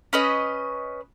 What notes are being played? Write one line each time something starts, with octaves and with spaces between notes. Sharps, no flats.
C#4 B4 D#5